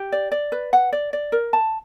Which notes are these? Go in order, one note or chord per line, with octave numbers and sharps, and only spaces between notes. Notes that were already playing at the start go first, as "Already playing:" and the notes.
Already playing: G4
D5
D5
B4
F#5
D5
D5
A#4
A5